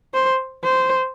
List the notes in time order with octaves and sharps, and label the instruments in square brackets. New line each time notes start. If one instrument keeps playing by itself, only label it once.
[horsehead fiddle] C5
C5